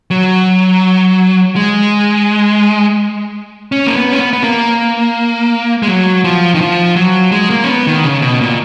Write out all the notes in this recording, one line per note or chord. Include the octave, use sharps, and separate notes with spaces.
F#3
G#3
C#4
A#3
B3
C#4
B3
B3
A#3
G#3
F#3
F3
D#3
F3
F#3
G#3
A#3
C#4
B3
D#3
C#3
B2
A#2